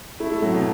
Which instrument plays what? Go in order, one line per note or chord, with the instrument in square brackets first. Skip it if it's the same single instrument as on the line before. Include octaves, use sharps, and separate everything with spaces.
[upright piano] A3 [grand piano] E4
[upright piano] A3
[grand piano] A2 [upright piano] F#3
[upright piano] B2